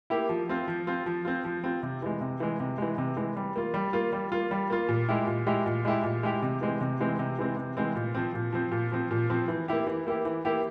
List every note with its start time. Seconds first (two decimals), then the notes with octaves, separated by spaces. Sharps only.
0.10 A#3 E4 G4
0.29 F3
0.49 C4 F4
0.68 F3
0.87 C4 F4
1.06 F3
1.25 C4 F4
1.44 F3
1.64 C4 F4
1.83 C3
2.02 E3 G#3
2.21 C3
2.40 E3 G#3
2.60 C3
2.78 E3 G#3
2.98 C3
3.17 E3 G#3
3.37 G3
3.56 A#3 F4
3.74 G3
3.93 A#3 F4
4.13 G3
4.32 A#3 F4
4.51 G3
4.70 A#3 F4
4.89 A#2
5.09 G#3 E4 G4
5.27 A#2
5.47 G#3 E4 G4
5.66 A#2
5.85 G#3 E4 G4
6.04 A#2
6.23 G#3 E4 G4
6.42 C3
6.61 E3 G#3 C4
6.81 C3
7.00 E3 G#3 C4
7.19 C3
7.39 E3 G#3 C4
7.57 C3
7.77 E3 G#3 C4
7.95 A#2
8.15 F3 C4
8.34 A#2
8.52 F3 C4
8.72 A#2
8.92 F3 C4
9.11 A#2
9.30 F3 C4
9.48 E3
9.68 A#3 E4 G4
9.87 E3
10.07 A#3 E4 G4
10.25 E3
10.45 A#3 E4 G4